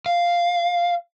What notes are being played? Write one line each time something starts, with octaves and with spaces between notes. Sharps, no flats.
F5